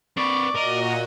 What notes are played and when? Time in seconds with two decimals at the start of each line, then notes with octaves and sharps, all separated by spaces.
0.18 C4 B4 D5 C#6
0.56 A#2 F#4 A#4 D#5